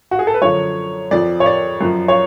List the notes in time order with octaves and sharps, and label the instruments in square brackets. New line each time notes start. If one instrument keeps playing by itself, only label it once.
[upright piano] F#4
G#4
A4
B4
F#2 D3 F3 C#5
F2 F3 D5
C#5
D5
F#2 F3
C#5